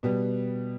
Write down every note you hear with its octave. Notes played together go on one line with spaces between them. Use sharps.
B2 G3 B3